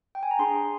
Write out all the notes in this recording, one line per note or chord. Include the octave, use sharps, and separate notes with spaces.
G5
G#5
A#5
D4 G#4 C6